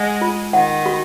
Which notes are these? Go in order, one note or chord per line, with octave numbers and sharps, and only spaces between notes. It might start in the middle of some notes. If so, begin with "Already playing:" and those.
Already playing: G#3 F#5
F4
D#3 F#5
F#4